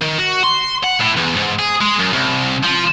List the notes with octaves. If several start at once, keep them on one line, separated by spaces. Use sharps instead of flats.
D#3
F#4
C6
F#5
A2
E2
G#2
G#4
G#3
F#2
C2
F3